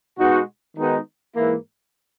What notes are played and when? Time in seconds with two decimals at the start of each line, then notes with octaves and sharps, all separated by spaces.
0.19 B2 G#3 D#4 F#4
0.76 D#3 G#3 B3 D#4 F#4
1.34 G#2 E3 A#3 E4